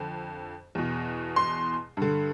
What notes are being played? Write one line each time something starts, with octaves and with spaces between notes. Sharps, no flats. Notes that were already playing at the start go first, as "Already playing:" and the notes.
Already playing: F2 D3
E2 B2
C6
G2 D3